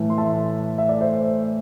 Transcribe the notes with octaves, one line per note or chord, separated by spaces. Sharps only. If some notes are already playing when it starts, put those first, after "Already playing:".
Already playing: A2 E3 A3
C6
E5 A5
E5
D5
C5 E5